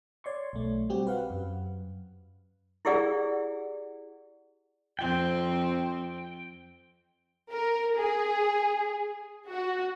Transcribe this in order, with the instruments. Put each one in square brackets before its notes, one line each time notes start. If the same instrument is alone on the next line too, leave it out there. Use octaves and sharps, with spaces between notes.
[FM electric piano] C#5 D5 C6 C#6
B1 A3
G3 C4 F#4 G4
B4 F5 F#5
F#2
[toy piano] E4 G4 G#4 D5 F#5
[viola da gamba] F2 C4 [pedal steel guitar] G5
[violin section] A#4
G#4
F#4